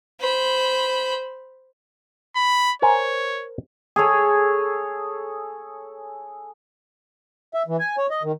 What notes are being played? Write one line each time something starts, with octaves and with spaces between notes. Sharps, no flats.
C5 B5
B5
A#4 C5 C#5 G#5
G#4 A4 C#5
E5
E3
G#5
C#5
D#5
D#3